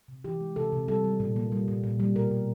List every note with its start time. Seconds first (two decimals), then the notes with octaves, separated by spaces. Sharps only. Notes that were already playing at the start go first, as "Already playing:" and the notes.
0.08 C3
0.24 E3 G4
0.41 G#3
0.56 C3 A4
0.72 C3
0.88 G3 A4
1.04 G3
1.20 A#2
1.36 A#3
1.52 G3
1.68 A#2
1.84 A#2
2.00 G3
2.15 B2 A#4
2.31 B2